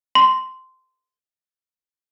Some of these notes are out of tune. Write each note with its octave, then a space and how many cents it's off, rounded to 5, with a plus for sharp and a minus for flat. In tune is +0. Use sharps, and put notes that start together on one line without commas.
C6 -10